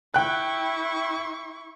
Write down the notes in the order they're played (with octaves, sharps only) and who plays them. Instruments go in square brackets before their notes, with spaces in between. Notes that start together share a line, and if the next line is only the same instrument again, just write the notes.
[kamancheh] E4 C#6 [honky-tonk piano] G5 F#6